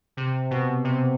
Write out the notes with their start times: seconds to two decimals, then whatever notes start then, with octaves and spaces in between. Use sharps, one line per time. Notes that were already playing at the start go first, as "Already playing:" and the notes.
0.17 C3
0.51 B2
0.85 C3